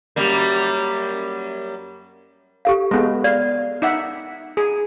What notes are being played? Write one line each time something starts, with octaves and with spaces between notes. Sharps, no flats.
F#2 G3 A#3
G4 A4 F5
G#3 B3 A4 B4
D5 F5
D#4 E5 F#5
G#4